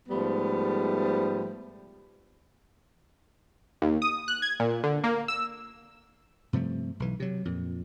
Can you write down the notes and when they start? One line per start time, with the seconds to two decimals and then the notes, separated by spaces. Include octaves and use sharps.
0.09 G#2 F3 G3 A3 B3
3.82 D#2
4.02 D#6
4.28 F#6
4.42 G#6
4.60 A#2
4.84 D3
5.04 A#3
5.28 E6
6.53 G2 C3 F3 A3
7.00 B1 E3
7.20 C3 F#3
7.45 F2 A#2